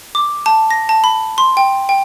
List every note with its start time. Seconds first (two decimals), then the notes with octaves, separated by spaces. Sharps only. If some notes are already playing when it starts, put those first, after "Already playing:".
0.15 D6
0.46 A5
0.71 A#6
0.89 A5
1.04 B5
1.38 C6
1.57 G5
1.89 G5